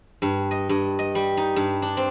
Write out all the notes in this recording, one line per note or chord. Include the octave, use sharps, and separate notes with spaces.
G2
D#5
G2
D#5
G3
D#4
G2
D4
C4